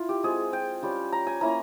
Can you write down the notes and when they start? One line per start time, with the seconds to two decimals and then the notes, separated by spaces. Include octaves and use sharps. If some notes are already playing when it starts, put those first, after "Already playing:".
Already playing: E4 F4
0.09 G4
0.23 G#3 C4 F4 G#4
0.53 G5
0.83 G3 C#4 F4
1.12 A#5
1.27 G#5
1.41 A#3 C#4 E4 A#5